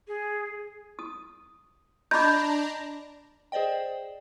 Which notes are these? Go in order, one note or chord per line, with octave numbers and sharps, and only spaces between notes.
G#4
D#6
D4 D#5 A#5 B5 D6 G6
G#4 C5 D5 D#5 G5